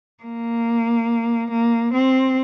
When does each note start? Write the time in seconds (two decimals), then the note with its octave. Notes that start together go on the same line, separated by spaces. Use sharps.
0.24 A#3
1.51 A#3
1.94 C4